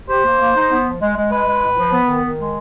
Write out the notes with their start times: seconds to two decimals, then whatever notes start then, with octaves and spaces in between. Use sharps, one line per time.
0.09 G4 C5
0.25 A#3
0.40 A#3
0.55 D#4
0.70 B3
0.85 F3
1.00 G#3
1.16 G#3
1.31 G#3 B4
1.46 G#3
1.61 A2
1.77 F3
1.92 B3
2.07 D#3
2.23 D#3
2.38 G#3